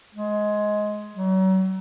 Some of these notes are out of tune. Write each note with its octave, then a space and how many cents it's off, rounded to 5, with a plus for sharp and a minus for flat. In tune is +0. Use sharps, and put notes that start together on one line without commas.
G#3 +15
F#3 +35